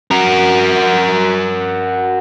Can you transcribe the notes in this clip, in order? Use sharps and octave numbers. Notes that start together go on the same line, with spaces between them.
F#4 A#4